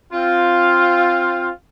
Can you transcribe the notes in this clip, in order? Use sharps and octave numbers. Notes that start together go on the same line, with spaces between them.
C4 F4